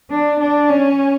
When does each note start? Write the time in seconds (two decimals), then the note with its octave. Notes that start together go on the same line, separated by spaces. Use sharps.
0.10 D4
0.40 D4
0.69 C#4